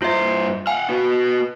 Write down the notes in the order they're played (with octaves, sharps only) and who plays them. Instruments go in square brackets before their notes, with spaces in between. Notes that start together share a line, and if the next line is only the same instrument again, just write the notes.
[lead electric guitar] G2 C5 [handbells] F4 E5
[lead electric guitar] F5 F#5 [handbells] G#5
[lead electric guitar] F#4 B4